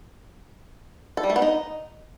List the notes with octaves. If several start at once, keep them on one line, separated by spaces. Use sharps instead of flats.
A4
G3
A3
B3
D#4